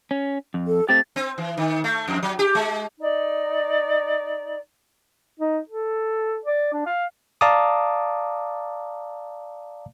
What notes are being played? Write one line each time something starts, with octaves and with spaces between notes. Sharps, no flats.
C#4
F2
A4
A3 C4 G4 A6
C4
E3
D#3
A3
F2
F#3
G4
G#3
D#4 D5
D#4
A4
D5
D4
F5
D5 F5 A5 A#5 D6 D#6